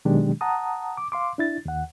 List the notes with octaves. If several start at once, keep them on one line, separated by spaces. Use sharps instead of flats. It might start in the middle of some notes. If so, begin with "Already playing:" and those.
B2 D#3 F#3 G#3 D4 G4
F#5 A5 A#5 D#6
D6
F5 C6 D6
D4 E4 A6
D#2 F#5